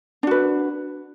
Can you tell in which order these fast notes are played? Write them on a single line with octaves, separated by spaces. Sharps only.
D4 F#4 B4